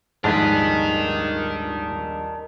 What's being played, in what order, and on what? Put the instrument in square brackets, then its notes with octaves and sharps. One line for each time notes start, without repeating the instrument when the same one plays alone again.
[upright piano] D#1 A#1 G#4 [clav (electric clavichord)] G#2 [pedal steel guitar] D4 B4 [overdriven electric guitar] A#4 D#5